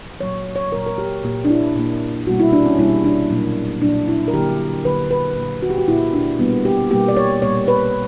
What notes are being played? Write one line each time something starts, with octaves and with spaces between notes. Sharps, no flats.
A#2 F#3 A#3 C#5
C#5
A#2 F#3 A#3 A#4
A#4
G4
A#2 A#3 G4
D4
E4
A#2 A#3
B2 G3 A#3 F#4
E4
D4
C#4
B2 G3 A#3 E4
D4
A#2 F#3 A#3
A#2 F#3 A#3 D4
E4
A#4
D3 F#3 A#3 G4
D3 F#3 A#3 B4
B4
A#2 A#3
F#4
G4
F#4
A#2 A#3 E4
D4
B2 G3 A#3 B3
G4
B2 G3 A#3 G4
D5
C#5
A#2 G3 A#3 C#5
B4